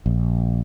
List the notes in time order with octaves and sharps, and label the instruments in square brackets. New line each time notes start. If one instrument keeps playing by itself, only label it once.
[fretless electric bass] A#1